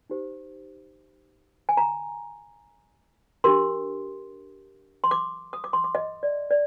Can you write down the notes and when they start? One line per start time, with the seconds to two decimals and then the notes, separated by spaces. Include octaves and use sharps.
0.10 D#4 G4 C5
1.69 G#5
1.77 A#5
3.44 D4 G4 A#4 C6
5.04 C6
5.11 D6
5.53 D#6
5.64 D6
5.73 C6
5.84 D6
5.95 D#5
6.23 D5
6.51 D5